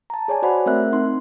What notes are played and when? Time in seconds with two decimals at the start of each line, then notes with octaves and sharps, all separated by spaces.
0.10 A5 A#5
0.28 G#4 C#5 D5 G#5
0.42 F#4 G#4 C5 D5 F#5 B5
0.66 A3 C4 A#4 E5 F#6
0.93 C4 D#4 C6